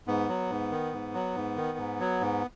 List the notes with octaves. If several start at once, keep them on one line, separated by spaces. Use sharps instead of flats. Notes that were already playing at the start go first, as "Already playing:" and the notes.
G#2 B3
F#3
G#2
D#3
G#2
F#3
G#2
D#3
G#2
F#3
G#2